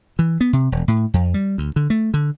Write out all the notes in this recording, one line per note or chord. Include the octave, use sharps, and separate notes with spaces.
E3
B3
C3
E1
A2
F2
G3
D2
D3
A3
D3